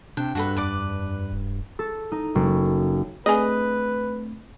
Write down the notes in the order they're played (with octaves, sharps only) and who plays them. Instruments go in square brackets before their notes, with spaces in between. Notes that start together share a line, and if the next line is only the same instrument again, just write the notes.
[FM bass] C3 [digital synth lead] D4 [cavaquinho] G5
[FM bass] G2 [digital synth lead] D4 [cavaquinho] F#4 A4 B4
[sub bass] F2 [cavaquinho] B4 D5 D6
[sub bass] D#1
[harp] A4
D#4
F#1
[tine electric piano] A3 C4 D4 [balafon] G#4 D5 G#5 [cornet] B4 [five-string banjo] D#5